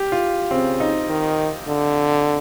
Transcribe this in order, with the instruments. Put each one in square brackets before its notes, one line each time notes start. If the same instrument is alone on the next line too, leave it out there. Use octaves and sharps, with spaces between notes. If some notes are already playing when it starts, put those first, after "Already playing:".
Already playing: [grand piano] G4
F4
[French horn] C#3 [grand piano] C4
[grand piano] D#4
[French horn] D#3
D3